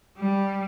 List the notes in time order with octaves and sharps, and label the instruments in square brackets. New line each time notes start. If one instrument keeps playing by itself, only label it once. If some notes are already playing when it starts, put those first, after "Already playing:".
[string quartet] G3